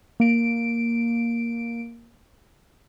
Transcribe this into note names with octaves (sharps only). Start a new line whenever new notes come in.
A#3 D7